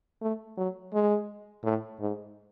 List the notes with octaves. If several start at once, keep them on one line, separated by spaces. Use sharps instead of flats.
A3
F#3
G#3
A2
G#2